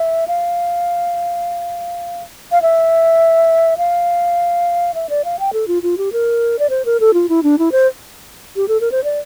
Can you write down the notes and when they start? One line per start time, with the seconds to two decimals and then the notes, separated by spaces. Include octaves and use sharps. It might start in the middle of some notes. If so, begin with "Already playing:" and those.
Already playing: E5
0.28 F5
2.52 F5
2.62 E5
3.78 F5
4.95 E5
5.09 D5
5.25 F5
5.39 G5
5.53 A4
5.68 F4
5.83 F4
5.98 G4
6.13 A#4
6.59 D5
6.70 C5
6.85 A#4
7.00 A4
7.14 F4
7.29 E4
7.43 D4
7.59 E4
7.72 C5
8.56 G4
8.68 A4
8.81 A#4
8.92 C5
9.04 D5